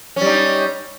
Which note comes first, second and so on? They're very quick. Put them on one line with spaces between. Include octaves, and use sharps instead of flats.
C#4 G3 D#4